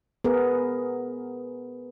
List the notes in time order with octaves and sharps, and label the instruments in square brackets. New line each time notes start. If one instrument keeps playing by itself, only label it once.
[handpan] B3 G#4 A#4